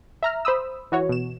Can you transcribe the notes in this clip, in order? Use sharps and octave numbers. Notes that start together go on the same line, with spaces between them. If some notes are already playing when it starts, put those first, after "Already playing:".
E5 A#5 F6
C5 B5 D#6 E6
E3 F#4 C#5
B2 E7